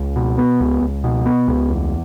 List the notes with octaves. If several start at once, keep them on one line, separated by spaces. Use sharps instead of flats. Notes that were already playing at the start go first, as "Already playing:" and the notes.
Already playing: C#2
B2
B3
C#2
C#2
B2
B3
C#2
E2